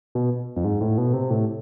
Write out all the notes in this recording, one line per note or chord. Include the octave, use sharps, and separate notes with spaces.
B2
F2
G#2
A2
B2
C3
A2